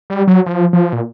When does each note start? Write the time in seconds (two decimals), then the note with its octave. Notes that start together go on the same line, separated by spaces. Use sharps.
0.10 G3
0.27 F#3
0.46 F3
0.73 F3
0.93 A#2